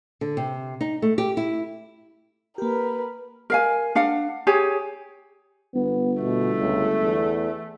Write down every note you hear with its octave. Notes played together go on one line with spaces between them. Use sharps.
D3
C3
D#4
A3
G4
E4
A#3 G4 A#4 B4
A#4 F5 G#5
D4 F5 F#5
G4 G#4 C#5 G#5
G1 B3
B2 A3
C#2
E2